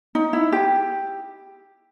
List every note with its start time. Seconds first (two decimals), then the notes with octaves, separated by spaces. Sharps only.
0.15 D#4
0.33 E4
0.52 G4